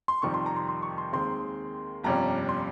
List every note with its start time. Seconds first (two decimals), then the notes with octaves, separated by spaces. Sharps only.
0.08 C6
0.22 F2 C3 D#3 G3 C#6
0.34 C6
0.46 A#5
0.56 C6
0.69 C6
0.83 C#6
0.98 C6
1.13 D#2 D#3 G#3 C4 C6
2.04 G1 F2 C3 G3 C#4 A#5
2.49 C6